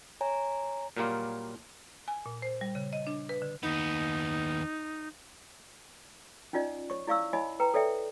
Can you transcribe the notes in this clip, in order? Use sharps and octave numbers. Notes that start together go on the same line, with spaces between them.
C#5 G#5 A#5
A#2 F#3 G3 A#3 F4
G#5
A#2
C5
G3
C#3
D#5
D4
B4
D3
D#2 B3 D#4
C#4 D#4 F4 D5 D#5
C#5 C#6
E4 D5 F5 C#6 E6
E4 C#5 D#5 G#5 B5
B4 G5 A#5
A4 C#5 D5 E5 G5